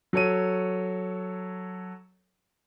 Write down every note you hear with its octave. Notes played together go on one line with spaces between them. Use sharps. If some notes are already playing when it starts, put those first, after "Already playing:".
F#3 A4 C#5 D#7